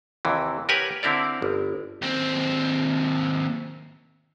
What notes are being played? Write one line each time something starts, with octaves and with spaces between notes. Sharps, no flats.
D#2 C3 E3
G4 A#4 B4 C#5 F#5 G#5
D3 C4 E4 A#4 D5
G1
D#2 C4